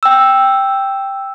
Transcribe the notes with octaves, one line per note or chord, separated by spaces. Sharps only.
G5 E6